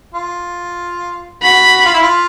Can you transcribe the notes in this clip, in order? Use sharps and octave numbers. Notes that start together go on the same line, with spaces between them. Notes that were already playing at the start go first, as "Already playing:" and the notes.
F4
F#4 B5
F4
E4
F4